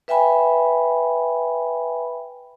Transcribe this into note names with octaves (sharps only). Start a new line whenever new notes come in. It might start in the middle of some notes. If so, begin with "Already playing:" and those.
B4 E5 G5 G#5 B5